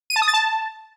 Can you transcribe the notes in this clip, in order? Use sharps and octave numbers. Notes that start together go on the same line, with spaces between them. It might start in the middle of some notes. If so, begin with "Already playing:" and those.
D#7
A5
D#6
A6
A5